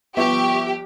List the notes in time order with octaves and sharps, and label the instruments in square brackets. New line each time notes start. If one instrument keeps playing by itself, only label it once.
[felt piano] G1 F3 E5 [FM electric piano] B3 [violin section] G4 [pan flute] C#6